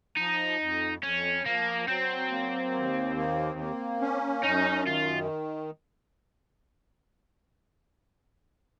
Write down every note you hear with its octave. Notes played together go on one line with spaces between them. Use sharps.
F3 D#4
F2
F2 C#4
F3 A#3
F#3 C4
A#3
D#2
A#3
A#3
C#4
F#2 D#4
D#3 F4